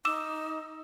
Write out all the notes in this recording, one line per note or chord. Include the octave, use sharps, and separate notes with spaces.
D#4 D6 E6 E7